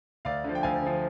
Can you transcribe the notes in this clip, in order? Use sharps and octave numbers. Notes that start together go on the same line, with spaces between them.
D2 D5 F5
D3 F3
G5
D2 F5 G#5
D3 F3